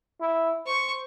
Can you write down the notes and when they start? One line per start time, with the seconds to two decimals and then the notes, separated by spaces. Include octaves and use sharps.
0.21 E4
0.66 C5 C#6